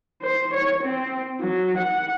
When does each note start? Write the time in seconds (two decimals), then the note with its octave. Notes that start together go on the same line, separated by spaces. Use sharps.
0.22 C5
0.54 C#5
0.83 C4
1.41 F#3
1.78 F#5